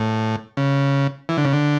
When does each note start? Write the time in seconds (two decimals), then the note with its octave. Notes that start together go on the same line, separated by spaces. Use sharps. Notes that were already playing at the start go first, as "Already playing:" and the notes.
Already playing: A2
0.57 C#3
1.29 E3
1.37 D3
1.45 C#3
1.53 D3